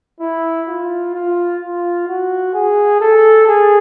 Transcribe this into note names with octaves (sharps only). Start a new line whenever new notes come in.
E4
F4
F4
F4
F#4
G#4
A4
G#4